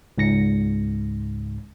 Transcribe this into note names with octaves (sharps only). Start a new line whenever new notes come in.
C#2 G#2 A#6 C#7